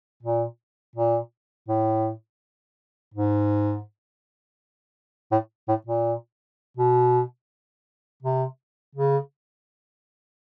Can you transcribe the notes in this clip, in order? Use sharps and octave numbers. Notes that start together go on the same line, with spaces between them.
A#2
A#2
A2
G#2
A2
A2
A#2
B2
C3
C#3